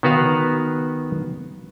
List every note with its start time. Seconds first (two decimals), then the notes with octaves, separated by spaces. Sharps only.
0.03 D#3 B3 F#4 B4 F5